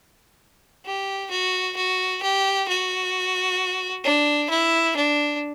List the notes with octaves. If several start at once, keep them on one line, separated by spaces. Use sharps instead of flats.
G4
F#4
F#4
G4
F#4
D4
E4
D4